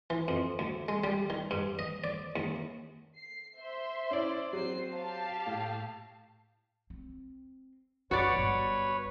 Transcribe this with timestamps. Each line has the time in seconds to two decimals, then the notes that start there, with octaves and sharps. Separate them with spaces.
0.10 E3
0.28 F2
0.59 D2
0.88 G#3
1.04 G3
1.30 D#3
1.51 G2
1.79 D#5
2.04 D5
2.36 D#2
3.17 C7
3.58 C5 E5 C6
4.11 C#4 E4 D5
4.53 F#3 C4 C5 C7
4.94 G4 F5 A5
5.47 A2
6.90 C4
8.11 F#1 F#2 F#4 B4 C#5 D5
8.36 G1